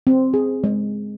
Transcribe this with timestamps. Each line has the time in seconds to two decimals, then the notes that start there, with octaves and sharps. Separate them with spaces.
0.07 C4
0.34 G#4
0.64 G#3